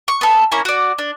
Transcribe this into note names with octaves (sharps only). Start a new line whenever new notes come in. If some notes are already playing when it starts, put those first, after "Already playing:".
C#6
B3 A4
A#3 C#4 E4 G#5
F#4 D5
D4